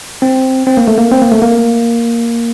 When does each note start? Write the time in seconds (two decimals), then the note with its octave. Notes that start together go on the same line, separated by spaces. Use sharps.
0.22 C4
0.67 C4
0.77 A#3
0.88 A3
0.98 A#3
1.12 C4
1.22 A#3
1.32 A3
1.42 A#3